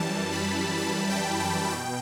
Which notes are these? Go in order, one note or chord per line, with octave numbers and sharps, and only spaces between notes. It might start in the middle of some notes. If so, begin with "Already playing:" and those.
Already playing: F#2 E3 G3 A5
B5
A5
G5
A5
B2 G5